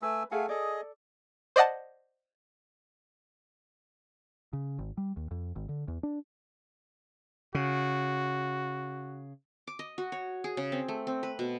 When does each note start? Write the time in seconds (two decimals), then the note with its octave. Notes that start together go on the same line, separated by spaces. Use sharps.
0.02 A3 B4 G#5 E6
0.32 A3 G#4 A4 F5 F#5 G#5
0.49 G#4 A4 D5 D#5
1.56 C5 D5 D#5 F#5 A5
4.53 C#3
4.79 G#1
4.97 G3
5.17 D#2
5.31 F2
5.56 G#1
5.69 D3
5.88 E2
6.03 D4
7.55 C#3 F#4
9.67 D6
9.79 D#5
9.98 F#4
10.12 C#5
10.44 G#4
10.57 C#3
10.72 C4
10.88 A3
11.07 C4
11.23 B4
11.39 B2